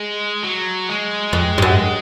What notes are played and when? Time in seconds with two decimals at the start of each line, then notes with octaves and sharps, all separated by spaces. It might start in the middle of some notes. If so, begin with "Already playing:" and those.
Already playing: G#3
0.44 F#3
0.89 G#3
1.33 F2
1.58 G2
1.62 F#2